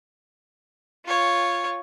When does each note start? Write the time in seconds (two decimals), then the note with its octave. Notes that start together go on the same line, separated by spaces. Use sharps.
1.05 F4 C#5